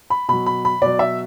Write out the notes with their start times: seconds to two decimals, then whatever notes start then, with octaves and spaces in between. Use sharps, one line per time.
0.10 B5
0.28 B2 F#3 B5
0.46 B5
0.65 B5
0.81 B2 F#3 D5
0.99 E5